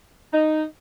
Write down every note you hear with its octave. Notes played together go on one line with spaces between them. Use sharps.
D#4